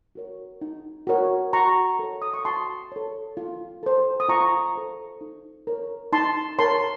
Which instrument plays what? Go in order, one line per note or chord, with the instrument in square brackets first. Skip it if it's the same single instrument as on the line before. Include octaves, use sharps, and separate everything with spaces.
[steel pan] F#4 A#4 C#5
D#4
F#4 A#4 C#5
F#4 A#5 C#6
A4 C#5
D#6
C#6
F#4 A5 C6
A4 C#5
F4
A4 C5
D#6
F4 A#5 C#6
A4 C5
D#4
A#4 C#5
D#4 A5 C6
A#4 C#5 A5 C6